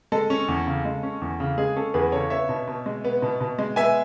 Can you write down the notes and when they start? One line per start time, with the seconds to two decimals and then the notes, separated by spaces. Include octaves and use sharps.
0.12 G#3 A4
0.30 C#4
0.48 E2
0.66 C#3
0.85 G#3
1.03 C#4
1.21 E2
1.40 C#3
1.58 G#3 G#4
1.76 C#4 A4
1.94 E2 G#4 B4
2.12 C#3 A4 C#5
2.30 B3 C#5 E5
2.49 B2
2.68 B2
2.86 G#3
3.04 B3
3.22 B2
3.40 B2
3.59 G#3
3.76 B3 E5 G#5